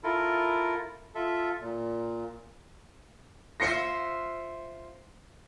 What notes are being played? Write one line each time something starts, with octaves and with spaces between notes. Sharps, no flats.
E4 F4 A4 A#4
F4 A4 E5
A#2
F4 C5 E5 A#6 C7 C#7